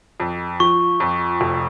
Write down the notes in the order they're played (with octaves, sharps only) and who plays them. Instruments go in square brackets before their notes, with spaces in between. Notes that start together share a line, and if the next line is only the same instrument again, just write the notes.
[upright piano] F2
[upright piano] F3 [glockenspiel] C#6
[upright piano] F2
F1